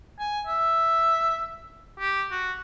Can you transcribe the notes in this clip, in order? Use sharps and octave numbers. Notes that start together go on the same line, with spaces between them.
G#5
E5
G4
F#4